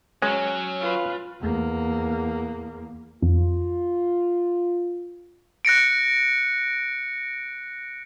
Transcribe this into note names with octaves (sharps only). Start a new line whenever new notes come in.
F#3 G#3 C#4
F4 B4
E2 A#3
F2 F4
F#6 A#6 C#7 D7